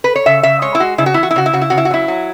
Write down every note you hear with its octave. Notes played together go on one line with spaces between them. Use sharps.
B4
C#5
C#3 E5
C#3 E5
G#3 C#5
E4
G#3 F#4
C#3 E4
F#4
E3 E4
F#4
E4
C#3 F#4
E4
C#3 F#4
E4
C#3 F#4
E4
F#4
F#3 E4
F#3